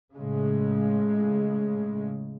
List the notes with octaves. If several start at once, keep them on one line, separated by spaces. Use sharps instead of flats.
A2 C#3 G#3